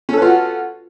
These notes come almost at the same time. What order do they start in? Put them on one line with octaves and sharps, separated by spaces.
C#4 A4 B4 F4 F#4